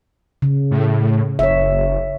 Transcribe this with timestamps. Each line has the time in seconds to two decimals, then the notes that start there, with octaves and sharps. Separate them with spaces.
0.42 C#3
0.71 A2
1.39 F#1 C#5 E5